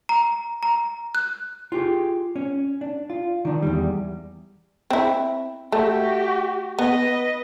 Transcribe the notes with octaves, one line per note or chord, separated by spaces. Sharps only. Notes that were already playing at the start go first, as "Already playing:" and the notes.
A#5
A#5
F#6
F4 G4 G#4
C#4
D4
F4
D#3 D4
E2 G#2 G3
C4 E4
A3 F#4 G4
B3 B4 D#5